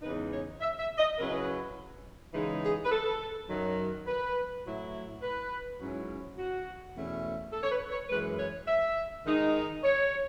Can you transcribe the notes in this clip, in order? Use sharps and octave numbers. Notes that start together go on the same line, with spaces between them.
E2 C#3 G#3 D#4 B4
C#5
E5
E5
D#5
C#3 F#3 C#4 E4 B4
C#3 E3 G#3 D#4
G#4
B4
A4
F#2 D#3 F#3
B4
A2 F#3 A3 E4
B4
G#2 F#3 C#4 E4
F#4
E2 B2 A3 C#4 E4
A4
C#5
B4
C#5
F#2 E3 G#3 B4
C#5
E5
D#3 G#3 D#4
C#5